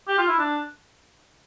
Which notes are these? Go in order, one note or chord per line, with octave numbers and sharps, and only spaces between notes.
G4
F4
E4
D4